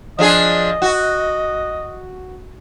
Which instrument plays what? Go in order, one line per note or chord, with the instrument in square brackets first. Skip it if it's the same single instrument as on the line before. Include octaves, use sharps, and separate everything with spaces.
[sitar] F3 D4 G#4 [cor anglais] D#5
[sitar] F#4